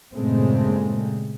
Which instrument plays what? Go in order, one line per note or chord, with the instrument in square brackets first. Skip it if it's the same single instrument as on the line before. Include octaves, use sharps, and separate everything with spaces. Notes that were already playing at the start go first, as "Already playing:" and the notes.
[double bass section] G2 A#2 C#3 G#3 A3 C4